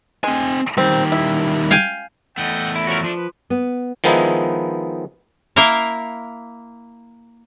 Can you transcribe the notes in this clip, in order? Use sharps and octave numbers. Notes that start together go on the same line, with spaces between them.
G#3 C4 G#5
D#3 G3 C4
E4
F5 G5 G#5
E2 A3 D#5 F#5 G5
E4
F3 C#4 E4 F#4 A#4
F3 A3 D4
B4
B3
D#3 F3 G#3 B3 D#4 E4
A#3 E4 A#4 F5